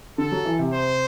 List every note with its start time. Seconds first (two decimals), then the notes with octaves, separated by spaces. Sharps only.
0.18 D3 A4
0.32 F#3
0.45 E3
0.59 C3
0.72 C5